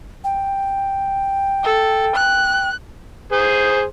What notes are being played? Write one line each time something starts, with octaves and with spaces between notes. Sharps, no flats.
G5
A4
F#6
G#4 C5